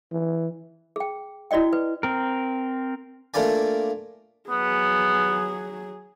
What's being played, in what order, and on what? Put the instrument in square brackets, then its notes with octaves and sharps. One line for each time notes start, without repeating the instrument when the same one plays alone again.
[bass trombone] E3
[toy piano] G#4 G5
E4 F#4 D5 D#5 G5
B4
[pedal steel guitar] C4 A#4
[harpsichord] A3 A#3 D4 F4 D5 G#5
[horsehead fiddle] F#3 G#4 [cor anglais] B3